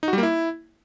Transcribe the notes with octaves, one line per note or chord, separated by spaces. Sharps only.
D#4
F#4
G3
A#3
E4